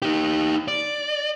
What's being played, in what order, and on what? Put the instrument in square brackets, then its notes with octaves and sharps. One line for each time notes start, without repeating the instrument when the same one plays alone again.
[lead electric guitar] D#4 G4
D5